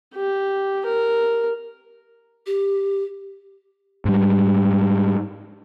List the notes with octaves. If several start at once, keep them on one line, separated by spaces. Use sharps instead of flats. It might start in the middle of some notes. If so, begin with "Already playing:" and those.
G4
A#4
G4
G#2 G3